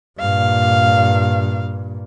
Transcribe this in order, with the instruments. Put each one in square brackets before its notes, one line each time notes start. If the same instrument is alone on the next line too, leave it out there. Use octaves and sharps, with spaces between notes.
[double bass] G2 A#2 [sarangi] F5